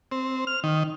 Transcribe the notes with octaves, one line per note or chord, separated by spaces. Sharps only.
C4
F6
D#3